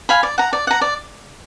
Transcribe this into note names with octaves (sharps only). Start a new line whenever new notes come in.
F5 G#5 B5
D5
F#5 A#5
D5
F#5 A#5
D5